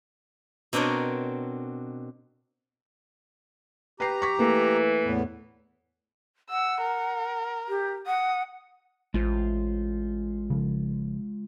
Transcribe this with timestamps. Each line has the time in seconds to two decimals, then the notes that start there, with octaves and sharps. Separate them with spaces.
0.73 B2 C4 D4 A#4 C#5 D#5
4.00 G4 B4 G5 A#5 C7
4.22 C#6 B6
4.39 E3 A3 A#3
5.04 E2 A2 B3
6.50 F#5 E6
6.81 A#4
7.69 G4
8.07 F#5 D#6
9.14 A1 G#3 F4 C5
10.50 C#3 F3